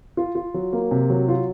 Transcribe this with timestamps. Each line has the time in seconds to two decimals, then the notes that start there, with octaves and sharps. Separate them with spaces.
0.17 F4
0.35 F4
0.54 F#3
0.73 A#3
0.91 C3
1.10 F#3
1.28 F4